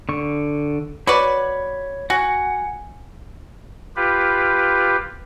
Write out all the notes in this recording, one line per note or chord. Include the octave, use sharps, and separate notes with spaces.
D3 C#6
F#4 B4 C#5 D5 B5
F#4 F#5 G#5
F4 G4 B4